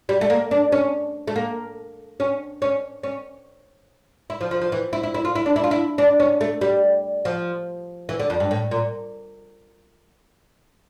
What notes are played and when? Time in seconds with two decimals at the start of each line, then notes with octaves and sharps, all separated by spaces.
0.09 G3
0.21 A3
0.30 A#3
0.51 D4
0.72 C#4
1.27 A3
1.36 A#3
2.20 C#4
2.62 C#4
3.03 C#4
4.30 E4
4.41 F3
4.51 F3
4.61 F3
4.72 E3
4.93 E4
5.03 E4
5.14 E4
5.25 F4
5.35 E4
5.46 D4
5.56 E4
5.64 F4
5.71 E4
5.98 D4
6.20 C#4
6.41 A3
6.61 G3
7.25 F3
8.09 E3
8.19 D3
8.30 F2
8.40 G2
8.51 A2
8.71 A#2